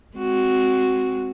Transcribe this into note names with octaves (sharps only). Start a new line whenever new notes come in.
G#3 C4 F#4